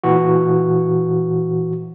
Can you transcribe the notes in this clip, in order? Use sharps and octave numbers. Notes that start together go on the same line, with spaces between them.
A#2 E3 F#4